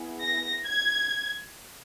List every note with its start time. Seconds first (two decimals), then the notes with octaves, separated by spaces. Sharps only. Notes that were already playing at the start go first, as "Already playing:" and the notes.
Already playing: B3 E4 G#4
0.23 A#6
0.67 G#6